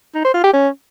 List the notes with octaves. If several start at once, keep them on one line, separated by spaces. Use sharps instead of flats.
D#4
C5
F4
G4
C#4